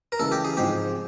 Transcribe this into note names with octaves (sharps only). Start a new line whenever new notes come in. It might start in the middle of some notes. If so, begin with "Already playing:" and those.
A#4
C#3 E3 G#3 A4
G4
G#4
G#2 F3 G#3 C4 G4